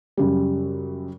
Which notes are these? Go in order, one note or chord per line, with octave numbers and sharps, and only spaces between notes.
F#2 C#3 G3